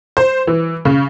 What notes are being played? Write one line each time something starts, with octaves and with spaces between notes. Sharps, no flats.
C5
E3
C#3